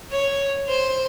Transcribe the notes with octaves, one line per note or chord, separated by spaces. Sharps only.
C#5
C5